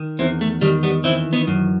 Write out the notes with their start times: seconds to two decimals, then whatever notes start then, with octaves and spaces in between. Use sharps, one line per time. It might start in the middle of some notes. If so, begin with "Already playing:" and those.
Already playing: D#3
0.19 E2 C4 E4
0.41 A3
0.61 D#3 G3
0.83 G3 B3
1.04 E3 C4 E4
1.33 B3 D#4
1.47 F#2